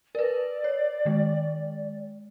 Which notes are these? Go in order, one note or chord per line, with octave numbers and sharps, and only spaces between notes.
A#4 B4 D5
C#5
D#3 G#3